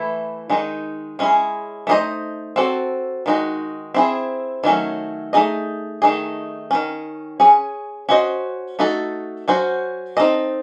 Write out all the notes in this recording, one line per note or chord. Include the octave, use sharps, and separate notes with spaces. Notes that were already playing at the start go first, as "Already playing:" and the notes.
Already playing: E3 A3 E4
D#3 G#3 D#4
G#3 C#4 E4 G#4
A3 D#4 G#4 C5 D#5
C4 F#4 A4 C#5
D#3 G#3 D#4 F#4
C4 E4 G#4
D#3 F#3 A3 C#4
A3 D#4 G#4 D#5
D#3 A3 D#4 G#4
D#3 F#3 C#4
C#4 G#4 C#5
C#4 F#4 C5 D#5
A3 D#4 F#4 A4
F#3 C#4 F#4 C5
C4 D#4 A4 D#5